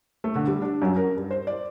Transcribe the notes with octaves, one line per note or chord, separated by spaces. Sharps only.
A3
D3
G3
D4
F#2
A#4
G2
C5
D5